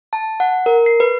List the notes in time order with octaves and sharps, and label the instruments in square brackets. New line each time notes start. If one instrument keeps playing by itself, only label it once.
[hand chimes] A5
F#5
A#4
C7
B4